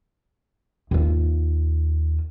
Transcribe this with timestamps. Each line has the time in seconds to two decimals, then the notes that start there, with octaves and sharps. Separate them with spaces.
0.91 D#2 F4